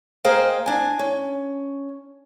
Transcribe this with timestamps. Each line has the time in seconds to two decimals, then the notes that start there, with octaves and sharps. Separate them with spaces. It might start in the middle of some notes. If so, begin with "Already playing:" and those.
0.24 A#3 G#4 C5 D#5 F5 G5
0.66 D4 G#5
0.99 C#4